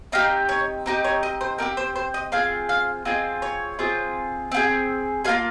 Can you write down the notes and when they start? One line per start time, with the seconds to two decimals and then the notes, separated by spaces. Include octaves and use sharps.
0.12 C4 D#4 G4 F5
0.49 C#5
0.86 C4 D#4 G4
1.04 C#5
1.23 D#5
1.41 C5
1.58 C4 D#4 G4 A#4
1.77 C5
1.96 C5
2.14 D#5
2.32 C4 F4 G#4 F5
2.69 F5
3.05 C4 F4 G#4 D#5
3.42 C#5
3.79 C4 F4 G#4
4.52 C4 F4 G#4
5.24 A#3 F4 G#4 F5